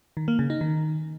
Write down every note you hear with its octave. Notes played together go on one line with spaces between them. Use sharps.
D#3
A#3
C#3
D#4
D#3